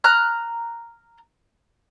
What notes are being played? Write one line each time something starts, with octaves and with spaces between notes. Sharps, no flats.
A#5 F6 F#6